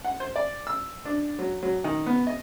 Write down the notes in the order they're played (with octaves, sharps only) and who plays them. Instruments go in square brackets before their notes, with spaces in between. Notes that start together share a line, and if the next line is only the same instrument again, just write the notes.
[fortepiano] F#5
C5
D5
E6
D4
F#3
F#3
D#3
B3
D#5